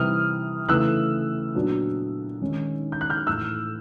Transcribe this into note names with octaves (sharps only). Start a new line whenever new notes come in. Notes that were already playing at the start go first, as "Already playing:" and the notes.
Already playing: C3 E3 G3 D#6 F6
C#3 E3 A3 E6 F#6
A#2 F#3 B3 D4
D#3 G#3 C#4
G6
F#6
F6 G6
A2 E3 A3 E6 F#6